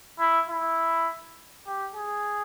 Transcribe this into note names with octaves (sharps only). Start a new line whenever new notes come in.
E4
E4
G4
G#4